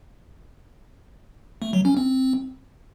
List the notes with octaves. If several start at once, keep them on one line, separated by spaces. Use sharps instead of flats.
A3
F#3
C#4
C4